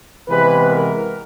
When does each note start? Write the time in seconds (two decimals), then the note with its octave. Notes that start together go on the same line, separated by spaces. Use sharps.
0.27 C3 E3 G#3 B3 B4
0.67 A#4